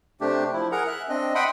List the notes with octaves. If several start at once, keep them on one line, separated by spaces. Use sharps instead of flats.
C3 A3 D4 G4
F3 E4
G#4 A#4 F#5 A#5
E5 F#6
C4 D4 D#5
E5 F#5 G5 B5 C6 D#6